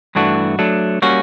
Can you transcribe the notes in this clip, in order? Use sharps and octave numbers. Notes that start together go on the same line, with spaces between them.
G2 E3 A3 D4 F#4
F#3 A3 D4
G3 A#3 C#4 F#4